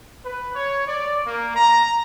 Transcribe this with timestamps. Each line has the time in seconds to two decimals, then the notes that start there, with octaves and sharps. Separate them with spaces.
0.23 B4
0.54 C#5
0.88 D5
1.24 A#3
1.56 A#5